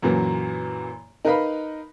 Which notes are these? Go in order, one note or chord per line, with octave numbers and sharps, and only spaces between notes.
F#2 A#2 E3 F#3
D#4 A#4 B4 D#5 F5 B5